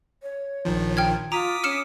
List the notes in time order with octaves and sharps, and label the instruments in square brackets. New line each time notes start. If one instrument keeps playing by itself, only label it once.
[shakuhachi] C#5
[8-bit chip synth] A#1 D#3 F3
[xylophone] G5 F6 G#6
[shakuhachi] F4 [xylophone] A#5 [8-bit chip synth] D6 D#6 B6
[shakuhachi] C#4 [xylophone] F6 C#7 E7